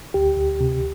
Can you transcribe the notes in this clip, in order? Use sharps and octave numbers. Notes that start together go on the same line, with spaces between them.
D2 G4
D2
C3